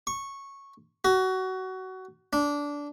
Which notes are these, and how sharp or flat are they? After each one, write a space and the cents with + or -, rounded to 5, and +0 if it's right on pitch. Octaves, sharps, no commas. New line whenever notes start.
C#6 -10
F#4 +20
D4 -15